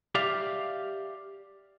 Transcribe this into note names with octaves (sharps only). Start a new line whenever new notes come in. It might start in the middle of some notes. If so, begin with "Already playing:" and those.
G4 D5 E5 F5